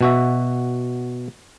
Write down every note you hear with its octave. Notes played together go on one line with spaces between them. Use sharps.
B2 F#4 E5